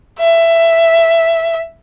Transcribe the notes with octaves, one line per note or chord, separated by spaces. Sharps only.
E5